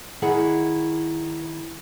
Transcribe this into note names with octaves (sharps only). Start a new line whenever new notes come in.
D#3 E4 G#4 F#5